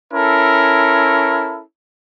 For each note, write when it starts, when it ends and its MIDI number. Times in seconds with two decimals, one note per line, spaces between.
0.12 1.61 61
0.12 1.61 64
0.12 1.61 69
0.12 1.61 70